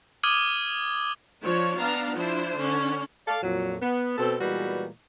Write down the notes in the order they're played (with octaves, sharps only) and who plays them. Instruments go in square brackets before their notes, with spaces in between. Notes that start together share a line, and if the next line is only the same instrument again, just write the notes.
[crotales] D6 D#6 F6 G#6 D#7 G7
[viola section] F3 D4 C#5
B3 D4 F5 A#5
F3 D4 E4 C5
D3 C#4 D4
[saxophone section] A4 D5 F5
F2 A#2 F#3
B3
B2 C4 A4
A#2 E3 G3 G#3 B3 F#4